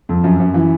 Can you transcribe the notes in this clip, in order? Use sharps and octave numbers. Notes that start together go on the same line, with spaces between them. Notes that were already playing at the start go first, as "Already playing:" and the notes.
F2
F#2
F#2
E3